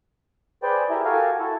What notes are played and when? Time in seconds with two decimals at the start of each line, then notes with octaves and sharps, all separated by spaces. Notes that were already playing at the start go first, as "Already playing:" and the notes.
0.63 G#4 B4 C5 D5 G5
0.90 E4 G4 G#4 A#4 E5
1.05 F#4 G4 A4 A#4 F5 G#5
1.39 E4 F#4 A4